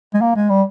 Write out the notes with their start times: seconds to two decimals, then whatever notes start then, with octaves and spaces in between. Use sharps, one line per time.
0.14 G#3
0.21 A#3
0.36 G#3
0.49 G3